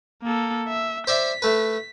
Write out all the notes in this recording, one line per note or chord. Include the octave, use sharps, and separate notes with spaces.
A#3 A4
E5
C5 D5 E5 B6
A3 B4